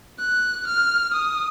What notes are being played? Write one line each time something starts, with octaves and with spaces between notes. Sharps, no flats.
F#6
F6
D#6